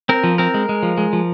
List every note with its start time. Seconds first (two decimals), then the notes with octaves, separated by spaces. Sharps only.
0.09 C4 A#4
0.24 F3
0.38 C4 A#4
0.54 G#3
0.69 G#3
0.83 F3
0.98 G#3
1.13 F3